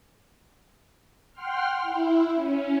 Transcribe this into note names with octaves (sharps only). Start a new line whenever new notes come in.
F#5 G5 C6 F6
E4
C#4